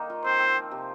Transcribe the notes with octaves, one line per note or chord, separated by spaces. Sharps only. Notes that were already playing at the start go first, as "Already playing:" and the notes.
Already playing: D#3 A#3 D#4
F4
C4 C5
C4
F3
C3